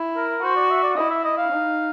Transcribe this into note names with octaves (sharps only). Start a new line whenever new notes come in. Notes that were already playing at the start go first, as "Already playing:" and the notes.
Already playing: E4
A#4
F#4 C5
D5
E5
D5
E4 D#5
E5
D#5
F5
D#4